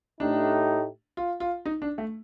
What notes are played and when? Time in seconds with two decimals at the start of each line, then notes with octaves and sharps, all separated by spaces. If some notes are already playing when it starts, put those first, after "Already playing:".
0.20 A2 A3 D4 D#4 G4
1.17 F4
1.40 F4
1.66 D#4
1.82 D4
1.98 A3